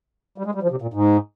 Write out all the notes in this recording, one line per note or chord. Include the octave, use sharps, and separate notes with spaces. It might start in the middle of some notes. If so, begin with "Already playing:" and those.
G3
G#3
G3
F3
C3
A#2
G#2